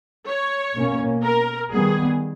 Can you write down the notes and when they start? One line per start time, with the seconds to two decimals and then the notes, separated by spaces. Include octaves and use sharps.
0.27 C#5
0.75 B2 A#3 C#4
1.23 A#4
1.71 D#3 G3 B3 G#4